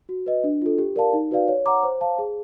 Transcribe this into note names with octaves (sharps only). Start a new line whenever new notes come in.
F#4
B4 D#5
D4
F4 A4
G4
A#4 D5 F5 A5
D#4
F#4 B4 D5 F5
C#5
F#5 A#5 D6
C5
F5 A5
G#4